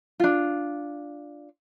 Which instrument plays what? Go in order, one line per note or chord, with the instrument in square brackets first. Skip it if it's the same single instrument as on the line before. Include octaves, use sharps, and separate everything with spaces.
[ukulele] D4 F4